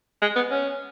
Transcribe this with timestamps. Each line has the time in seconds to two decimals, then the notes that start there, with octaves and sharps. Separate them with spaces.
0.22 G#3
0.36 B3
0.51 C#4